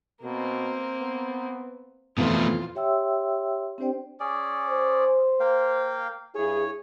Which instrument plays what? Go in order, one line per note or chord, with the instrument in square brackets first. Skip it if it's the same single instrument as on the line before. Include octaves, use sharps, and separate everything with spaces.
[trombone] B2 [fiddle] A#3 C4
[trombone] B3
[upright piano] F2 E3 [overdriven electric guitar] B2 A3 [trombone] B3 [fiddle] F4
[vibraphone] G4 C#5 E5 G5 C6 E6
C4 D4 G4 C5 D5 G5
[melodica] C#4 G#4 D5
[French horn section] C5
[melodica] A#3 F5 G5
[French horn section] G2 E4 G#4 [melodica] C#5